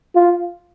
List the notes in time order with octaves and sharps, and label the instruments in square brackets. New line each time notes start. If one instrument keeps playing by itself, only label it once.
[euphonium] F4